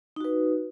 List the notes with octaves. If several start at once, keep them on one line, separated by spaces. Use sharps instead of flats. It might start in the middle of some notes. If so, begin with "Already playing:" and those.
D#4 F#4 B4